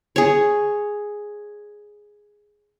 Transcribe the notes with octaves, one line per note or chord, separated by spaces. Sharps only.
G#4 C#5